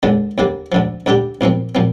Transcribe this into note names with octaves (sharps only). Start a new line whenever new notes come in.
D#2 D3 G#3
D#2 D3 G3 A#3
D2 D3 F3
D2 D3 G3 D4 G4
C2 A#2 F3 C4
A#2 F3 C4